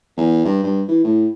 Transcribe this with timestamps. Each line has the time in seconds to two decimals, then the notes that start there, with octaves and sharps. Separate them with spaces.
0.17 E2
0.45 G2
0.64 G2
0.88 E3
1.04 A2